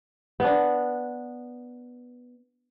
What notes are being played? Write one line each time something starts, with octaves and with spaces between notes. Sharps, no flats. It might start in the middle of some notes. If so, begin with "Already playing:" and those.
B3 D4